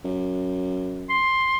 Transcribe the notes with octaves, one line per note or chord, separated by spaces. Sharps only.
F#2
C6